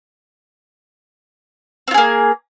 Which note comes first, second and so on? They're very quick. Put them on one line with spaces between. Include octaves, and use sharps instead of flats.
C4 F4 G#4 A#3